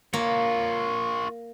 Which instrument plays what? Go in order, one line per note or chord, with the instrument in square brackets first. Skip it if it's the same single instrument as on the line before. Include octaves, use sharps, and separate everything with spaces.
[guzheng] A#3 [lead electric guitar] F4 C#5